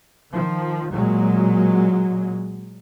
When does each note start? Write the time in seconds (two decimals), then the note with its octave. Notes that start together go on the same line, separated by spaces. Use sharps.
0.32 D#3 F3
0.91 A#2 F#3 G#3